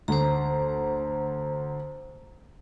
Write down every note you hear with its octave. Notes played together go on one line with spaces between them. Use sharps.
D2 C5 A#5